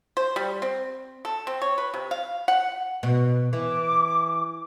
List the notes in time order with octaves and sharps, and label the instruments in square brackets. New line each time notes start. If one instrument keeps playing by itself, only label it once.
[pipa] C5
G3
C4
A4
C4
C#5
B4
C3
F5
F#5
[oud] B2
[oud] E3 [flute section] D6